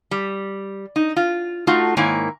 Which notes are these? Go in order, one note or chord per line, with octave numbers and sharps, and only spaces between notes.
G3
D#4
F4
A3 D#4 F4 F#4 A4
G#2 D#3 A#3 E4 C#5 G#5